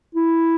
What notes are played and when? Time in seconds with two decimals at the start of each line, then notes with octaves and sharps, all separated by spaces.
0.15 E4